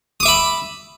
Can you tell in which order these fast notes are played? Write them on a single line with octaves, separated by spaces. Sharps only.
D#6 D6 E5 B5